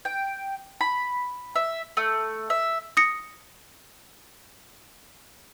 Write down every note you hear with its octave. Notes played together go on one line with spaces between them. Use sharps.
G5
B5
E5
A3
E5
D#6 A#6 C#7